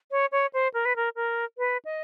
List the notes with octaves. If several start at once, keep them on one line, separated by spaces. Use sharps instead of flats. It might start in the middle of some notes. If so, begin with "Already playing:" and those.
C#5
C#5
C5
A#4
B4
A#4
A#4
B4
D#5